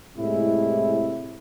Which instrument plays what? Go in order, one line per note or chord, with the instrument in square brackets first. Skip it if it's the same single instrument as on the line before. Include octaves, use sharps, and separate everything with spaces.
[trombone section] A2 C3 G#3 E4